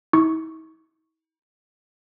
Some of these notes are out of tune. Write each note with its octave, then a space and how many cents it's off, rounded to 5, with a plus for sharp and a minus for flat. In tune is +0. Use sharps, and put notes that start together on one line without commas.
E4 -45 C#6 +0